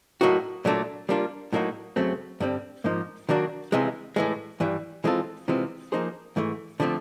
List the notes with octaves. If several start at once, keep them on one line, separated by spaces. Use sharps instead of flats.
A2 F#3 A#3 D#4 F#4
A#2 F#3 A3 D4
G3 A#3 D4 F4
A2 F#3 A#3 D#4 F#4
F#2 C#3 F#3 A3 C4
G2 D3 G3 C4
G#2 F3 A#3 D#4
D#3 F#3 A#3 D4 F#4
C#2 C3 E3 G#3
A2 E3 G#3
G2 E3 G3
E3 G#3 C4 F4 A4
C3 E3 G#3 C4 F4
F3 A#3 D#4 G#4 C5
G#2 E3 A3
D3 F3 A3 C4